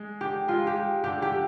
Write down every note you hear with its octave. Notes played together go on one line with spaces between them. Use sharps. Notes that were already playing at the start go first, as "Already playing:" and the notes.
Already playing: G#3
D3 G4
G#3 F4
G4
G#3
D3 G4
G4
D3